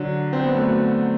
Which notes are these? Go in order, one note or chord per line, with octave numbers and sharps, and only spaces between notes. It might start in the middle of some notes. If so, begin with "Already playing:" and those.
Already playing: D3 F#3
C4
B3
F#3 A3